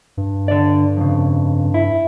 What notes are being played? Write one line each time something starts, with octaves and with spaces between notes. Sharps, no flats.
G2
D3 D5
F2 C#3
E4